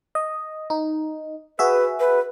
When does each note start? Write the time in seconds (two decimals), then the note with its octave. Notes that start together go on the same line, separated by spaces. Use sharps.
0.15 D#5
0.70 D#4
1.59 F#4 G#4 B4 E5
2.00 B4